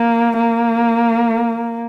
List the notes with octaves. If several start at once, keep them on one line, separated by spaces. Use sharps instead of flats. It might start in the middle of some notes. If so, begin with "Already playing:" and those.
Already playing: A#3
A#3